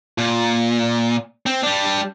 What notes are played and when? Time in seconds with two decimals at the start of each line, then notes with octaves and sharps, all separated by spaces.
0.18 A#2
1.46 C4
1.63 G3 D4